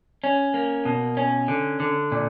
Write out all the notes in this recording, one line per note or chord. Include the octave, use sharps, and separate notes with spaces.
C#4
A#3
B2
C#4
D3
D3
A#2